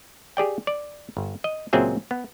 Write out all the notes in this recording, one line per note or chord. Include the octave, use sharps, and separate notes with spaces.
G4 G#4 D5 G5
D5
G1
D#5
C#2 A#2 F#3 C4 G#4 E5
B3